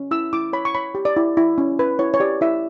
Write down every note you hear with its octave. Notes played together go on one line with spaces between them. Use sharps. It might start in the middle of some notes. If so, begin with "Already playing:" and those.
Already playing: C#4
E4 E6
E4 D6
C#5 B5
C#6
C#5 B5
G4
D5
E4
E4
C#4
B4
E4 C#5
C#5
G4 D5
E4 E5